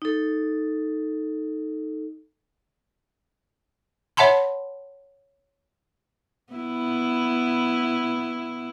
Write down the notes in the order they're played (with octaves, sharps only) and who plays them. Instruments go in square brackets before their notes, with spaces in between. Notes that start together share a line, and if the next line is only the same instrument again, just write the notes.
[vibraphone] D#4 A4
[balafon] C#5 E5 F#5 A5 B5 C6
[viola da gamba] B3 E4